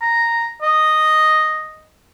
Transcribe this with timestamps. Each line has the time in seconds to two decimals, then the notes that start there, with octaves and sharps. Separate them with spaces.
0.02 A#5
0.62 D#5